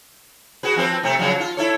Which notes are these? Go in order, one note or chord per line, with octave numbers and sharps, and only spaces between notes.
F#4 G#4 B4
F3 C4 B4
C3 A3 C4
C#3 F3 F#3
F4
E4 A4 C#5